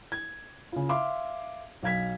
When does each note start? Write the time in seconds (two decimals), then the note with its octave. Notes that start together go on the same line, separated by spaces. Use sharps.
0.12 G#6
0.72 C#3 F4
0.89 E5 F5 C6 D6
1.83 B1 F5 G#6 B6